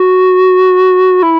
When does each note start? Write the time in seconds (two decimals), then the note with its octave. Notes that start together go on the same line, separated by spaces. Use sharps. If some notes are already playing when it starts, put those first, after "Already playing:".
Already playing: F#4
1.22 E4